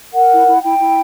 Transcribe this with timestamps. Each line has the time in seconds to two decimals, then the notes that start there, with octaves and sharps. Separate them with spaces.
0.13 A#4 F#5
0.31 E4
0.46 E4
0.62 E4 G5
0.80 E4